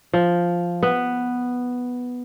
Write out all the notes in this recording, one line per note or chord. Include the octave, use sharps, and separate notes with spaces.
F3
B3